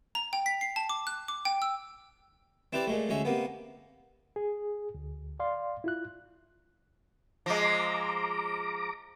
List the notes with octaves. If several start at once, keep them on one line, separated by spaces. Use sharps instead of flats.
A#5
G5
B6
C7
A5
D6
F#6
D6
G5
E6
C4 E4 G4 B4 D5
A#2 G#3 A3
D2 G#3 C#4 E5
C3 A#3 B3
G#4
D2
D5 F5 C6
E4 F4 F#6
F3 G#3 A#5 D6